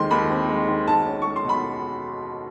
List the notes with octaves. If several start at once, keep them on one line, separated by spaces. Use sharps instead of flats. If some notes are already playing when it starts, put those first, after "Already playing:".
Already playing: D#2 D#3 G#3 C4 C6
D#2 B5
C4
G#3
D#3
B1 A5
C#4
G#3 C#6
C6
B2 B5